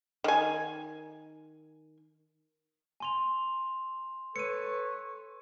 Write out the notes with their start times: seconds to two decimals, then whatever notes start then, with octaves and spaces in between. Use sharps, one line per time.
0.24 D#3 G#5
3.00 G#5 C6 F7
4.36 A4 B4 C#5 C#7 D#7